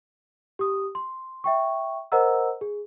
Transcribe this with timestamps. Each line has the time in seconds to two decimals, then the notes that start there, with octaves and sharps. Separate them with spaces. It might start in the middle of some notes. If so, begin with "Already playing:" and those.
0.59 G4 D#6
0.95 C6
1.44 E5 G5 C#6
2.12 A#4 C5 D#5 F#5 A#5 E6
2.61 G#4